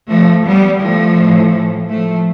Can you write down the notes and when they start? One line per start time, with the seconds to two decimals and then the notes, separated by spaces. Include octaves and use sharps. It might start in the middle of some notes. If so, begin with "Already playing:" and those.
0.10 F3 A3
0.46 G3 B3
0.81 F3 A3
1.18 A2 E3
1.88 F3 A3